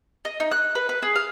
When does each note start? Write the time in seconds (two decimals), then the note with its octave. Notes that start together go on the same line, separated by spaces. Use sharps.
0.25 D#5
0.40 D#4
0.51 F#6
0.75 B4
0.89 B4
1.02 G#4
1.16 F5